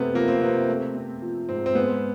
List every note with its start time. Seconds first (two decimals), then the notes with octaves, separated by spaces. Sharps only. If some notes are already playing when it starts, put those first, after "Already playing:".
Already playing: C3 A3 B3 C4
0.14 F3 A#3
0.28 C4
0.41 C3 B3
0.69 A3
0.95 C4
1.22 F3
1.49 G#2 C4
1.66 C4
1.75 G#3 B3